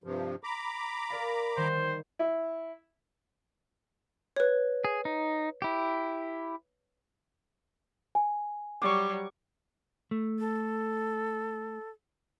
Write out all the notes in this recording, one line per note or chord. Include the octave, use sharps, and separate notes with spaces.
G2 C3 F3
A#5 B5 D6
A#4 D5 F5
D#3 G3 C5
E4
B4 C#5
G#4
D#4
E4 G4
G#5
F#3 G3 C#6 D6
A3
A4